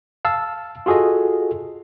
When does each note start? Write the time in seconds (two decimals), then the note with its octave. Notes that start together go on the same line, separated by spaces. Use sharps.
0.25 F5 A5 E6
0.86 F4 F#4 G#4 A4 D#5